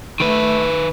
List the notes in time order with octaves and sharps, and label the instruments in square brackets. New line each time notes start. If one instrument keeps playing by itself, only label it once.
[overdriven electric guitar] D#3 B4 [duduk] A3